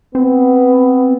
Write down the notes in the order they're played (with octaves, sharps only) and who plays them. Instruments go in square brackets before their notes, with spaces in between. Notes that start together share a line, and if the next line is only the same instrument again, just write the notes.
[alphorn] B3 [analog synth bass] C4